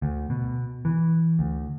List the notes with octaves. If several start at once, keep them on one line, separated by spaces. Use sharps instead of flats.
D2
B2
E3
D2